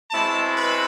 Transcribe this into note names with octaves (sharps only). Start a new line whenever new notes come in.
B2 G#3 C4 E4 A5
B4